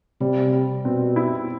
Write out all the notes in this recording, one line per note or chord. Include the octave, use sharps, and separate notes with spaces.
C3 G3
G3
B2 C4
E4